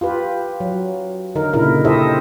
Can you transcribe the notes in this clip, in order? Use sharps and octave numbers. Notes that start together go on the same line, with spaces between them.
F4 G4 B4
F#3
D3 D#4 A#4
A#2 C#3 D#4 E4 A#4
E4 G4 A4 C5 D#5 E5